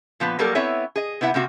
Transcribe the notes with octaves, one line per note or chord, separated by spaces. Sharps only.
A#2 F3 B3 B4
F#3 G3 A#3 A4 A#4 D5
B3 C4 E4 C#5 E5 G#5
G#4 D#5
C3 B3 E4 E5 F#5
C3 A#3 C4 F#4